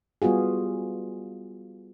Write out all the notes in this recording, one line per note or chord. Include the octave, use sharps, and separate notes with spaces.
G3 B3 F4 F#4 G#4